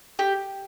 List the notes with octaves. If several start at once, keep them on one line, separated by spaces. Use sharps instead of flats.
G4